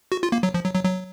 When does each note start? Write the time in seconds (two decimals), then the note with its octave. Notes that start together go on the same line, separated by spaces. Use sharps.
0.12 F#4
0.23 F4
0.32 A#3
0.43 F#3
0.54 F3
0.64 F#3
0.75 F#3
0.85 F#3